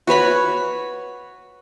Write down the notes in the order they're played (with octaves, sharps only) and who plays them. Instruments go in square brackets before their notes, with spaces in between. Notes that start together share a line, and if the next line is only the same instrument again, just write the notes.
[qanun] F#4 B4 C#5 B5